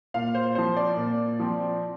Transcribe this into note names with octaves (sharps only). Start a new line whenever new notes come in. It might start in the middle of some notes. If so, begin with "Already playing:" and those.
A#2 F5
C5
F3 C4 C5
D5
A#2
F3 C4